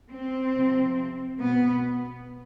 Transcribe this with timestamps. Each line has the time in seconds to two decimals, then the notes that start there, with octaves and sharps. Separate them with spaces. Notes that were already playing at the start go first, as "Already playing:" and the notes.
0.11 C4
0.53 C3 F3
1.38 B2 B3